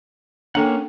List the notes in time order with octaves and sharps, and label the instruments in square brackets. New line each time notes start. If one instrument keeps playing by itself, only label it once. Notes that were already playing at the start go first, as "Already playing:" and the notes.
[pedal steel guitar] A#3 C#4 F#5 [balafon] D4 A4 G5